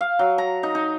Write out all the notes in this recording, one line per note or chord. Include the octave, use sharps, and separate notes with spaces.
F5
F#3
A#5
D#4
D#4